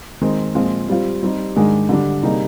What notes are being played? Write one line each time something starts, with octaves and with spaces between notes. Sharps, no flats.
D#3 G#3 C4
A#2 F3 G#3 C4 F4
G3 C4 F4
G3 C4 D#4 G4
G#2 D#3 G#3 D4 G#4
D3 G3 D4
C3 G3 A#3 D#4 G#4